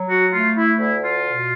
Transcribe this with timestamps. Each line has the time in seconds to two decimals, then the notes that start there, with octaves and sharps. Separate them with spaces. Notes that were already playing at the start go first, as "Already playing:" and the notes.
Already playing: F#3
0.08 F#4
0.31 A3 F4
0.55 E4
0.78 D2 E4
1.02 F4
1.25 B2